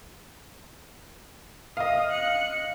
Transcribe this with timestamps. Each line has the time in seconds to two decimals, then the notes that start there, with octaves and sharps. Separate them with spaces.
1.77 D#5 F5 D#6
2.12 F#6 C#7